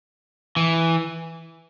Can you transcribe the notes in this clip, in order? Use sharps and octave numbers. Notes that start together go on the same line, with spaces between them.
E3